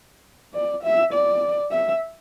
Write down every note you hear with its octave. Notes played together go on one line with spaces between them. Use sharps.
D5
E5
D5
E5